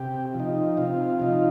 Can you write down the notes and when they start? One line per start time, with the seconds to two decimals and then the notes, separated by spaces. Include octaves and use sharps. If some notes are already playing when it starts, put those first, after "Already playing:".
Already playing: C3 G4
0.34 F3
0.40 D#4
0.77 C3 F4
1.20 F3 D#4